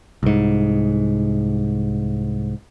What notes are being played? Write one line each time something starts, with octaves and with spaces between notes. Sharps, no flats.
C2 G#2